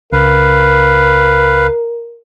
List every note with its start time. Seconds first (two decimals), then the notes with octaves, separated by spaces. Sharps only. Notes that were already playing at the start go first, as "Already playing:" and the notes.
0.12 C#2 A#4 B4 F5